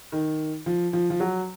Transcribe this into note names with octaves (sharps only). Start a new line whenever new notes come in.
D#3
F3
F3
F3
F#3